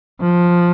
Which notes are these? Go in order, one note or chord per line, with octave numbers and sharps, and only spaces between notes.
F3